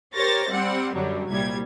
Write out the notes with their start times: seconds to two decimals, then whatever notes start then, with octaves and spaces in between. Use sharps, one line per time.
0.14 G4 A#4 C5 C#5 A6 A#6
0.50 G3 C4 F#5
0.94 F#2 D3 F#3 G3
1.29 C2 A#2 G3 G#6